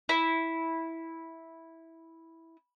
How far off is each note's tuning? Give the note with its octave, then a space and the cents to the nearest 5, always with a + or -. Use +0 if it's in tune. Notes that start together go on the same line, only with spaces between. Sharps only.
E4 -10